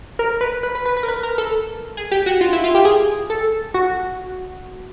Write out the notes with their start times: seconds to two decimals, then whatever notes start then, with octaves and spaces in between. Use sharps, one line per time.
0.19 A#4
0.41 B4
0.63 B4
0.75 B4
0.86 B4
0.97 B4
1.03 A#4
1.08 B4
1.23 A#4
1.38 A4
1.97 G#4
2.11 G4
2.26 F#4
2.41 F4
2.53 E4
2.64 F4
2.75 G4
2.85 G#4
3.30 A4
3.74 F#4